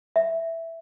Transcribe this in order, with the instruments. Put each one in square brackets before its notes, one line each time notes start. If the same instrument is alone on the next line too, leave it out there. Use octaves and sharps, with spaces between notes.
[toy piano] E5